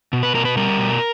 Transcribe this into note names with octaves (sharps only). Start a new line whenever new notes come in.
B2
B4
B2 A#4
B4
G3 A#4
B2